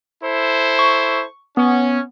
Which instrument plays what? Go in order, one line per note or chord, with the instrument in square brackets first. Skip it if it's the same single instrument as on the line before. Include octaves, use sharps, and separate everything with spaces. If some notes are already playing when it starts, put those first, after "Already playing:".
[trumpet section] E4 A4 C5
[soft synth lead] C#6
[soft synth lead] B3 [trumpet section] C#4